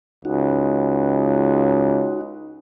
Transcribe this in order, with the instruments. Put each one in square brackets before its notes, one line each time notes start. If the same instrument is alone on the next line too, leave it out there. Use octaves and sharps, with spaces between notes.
[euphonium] C#2 [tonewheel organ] D#4 F#4